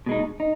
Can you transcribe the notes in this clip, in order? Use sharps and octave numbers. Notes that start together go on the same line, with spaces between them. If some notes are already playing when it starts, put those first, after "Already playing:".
B2 G#3 D#4
D#4